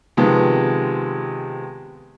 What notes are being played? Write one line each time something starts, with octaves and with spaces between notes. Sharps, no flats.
C3 D#3 F3 G#3 B3